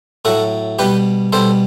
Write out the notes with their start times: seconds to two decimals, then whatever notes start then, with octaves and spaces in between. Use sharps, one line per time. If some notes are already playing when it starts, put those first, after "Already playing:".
0.25 A2 F#3 F#4 A4
0.79 B2 G3 G4 B4
1.33 B2 G3 A4 C5